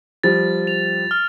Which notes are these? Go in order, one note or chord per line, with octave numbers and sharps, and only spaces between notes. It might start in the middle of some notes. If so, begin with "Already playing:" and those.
F3 G3 A6
F7
F6